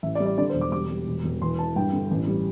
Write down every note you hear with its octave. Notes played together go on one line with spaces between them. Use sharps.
A1 E5
D5
G3
D5
D3 D5
C5
E1
D6
G3 D6
G3
E1
E1
E2 C6
E3 A5
G2 G5
D3
A1
G3